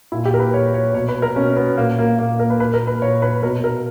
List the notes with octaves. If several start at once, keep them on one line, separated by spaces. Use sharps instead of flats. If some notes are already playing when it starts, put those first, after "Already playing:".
A#2 E4
G4
A#4
B4
A#2 C#5
C#5
B2 C#5
B4
A#4
B2 C#4
B3
A#2 A#3
A#3
A#2 A#3
A#4
B4
A#2 B4
A#4
B4
A#2 C#5
B4
B2 A#4
A#4